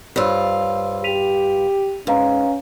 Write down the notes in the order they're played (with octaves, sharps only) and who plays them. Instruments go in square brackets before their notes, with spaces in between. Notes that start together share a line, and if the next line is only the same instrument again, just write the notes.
[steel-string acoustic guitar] G2 F4 [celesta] C5 C#5 E6
[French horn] G4 [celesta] B6 D#7 F7
[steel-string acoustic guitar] G#2 [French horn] C#4 [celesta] B4 F5 A#5